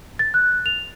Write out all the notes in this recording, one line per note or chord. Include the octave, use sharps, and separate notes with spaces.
A6
F#6
F7